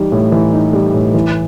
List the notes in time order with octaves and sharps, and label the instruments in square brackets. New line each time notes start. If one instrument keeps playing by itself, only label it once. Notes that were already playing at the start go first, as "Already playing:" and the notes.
Already playing: [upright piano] E3 G3 D#4
A2
E3
D#4
G3
A2
E3